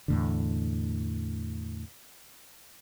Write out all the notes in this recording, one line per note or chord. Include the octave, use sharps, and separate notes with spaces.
E2 A2 D3